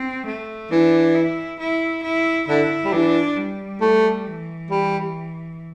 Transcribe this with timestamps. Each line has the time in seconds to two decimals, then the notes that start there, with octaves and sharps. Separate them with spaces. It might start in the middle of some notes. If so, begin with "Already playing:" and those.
Already playing: C4
0.26 A3
0.71 E3 D4
1.15 E4
1.60 E4
2.03 E4
2.48 D3 E4
2.85 G3
2.93 E3 D4
3.37 G3
3.81 A3
4.26 E3
4.71 G3